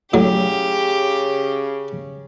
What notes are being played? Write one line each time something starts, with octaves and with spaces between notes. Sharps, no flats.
A2 C#3 F#3 G4